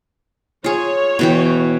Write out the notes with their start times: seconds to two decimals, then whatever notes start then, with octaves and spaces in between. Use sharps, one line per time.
0.64 F4 G#4 C#5
1.19 B2 E3 G5